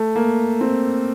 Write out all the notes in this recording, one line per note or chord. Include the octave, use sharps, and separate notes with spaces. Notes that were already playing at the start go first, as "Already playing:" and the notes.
Already playing: A3
A#3
C4